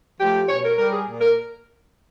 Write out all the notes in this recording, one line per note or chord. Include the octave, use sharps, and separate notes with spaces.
F3 A3 G4
B2 C#5
A#4
G3 A#4
G#4
A#2
A#4